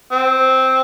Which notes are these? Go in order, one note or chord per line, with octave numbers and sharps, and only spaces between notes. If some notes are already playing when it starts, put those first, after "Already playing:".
C4